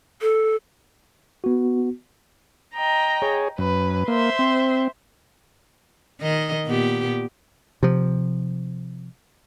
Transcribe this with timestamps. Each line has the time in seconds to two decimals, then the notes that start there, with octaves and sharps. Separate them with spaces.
0.21 A4
1.44 B3 F#4
2.76 D#5 G5 A#5
3.22 G#4 C#5
3.58 F#2 B4
4.08 A#3 C5 E5 C6
4.39 C4
6.20 D#3 D#5
6.65 A#2 B3 G4
7.83 C3 F3